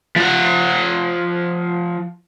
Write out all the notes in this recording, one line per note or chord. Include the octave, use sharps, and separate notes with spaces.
F3 F#5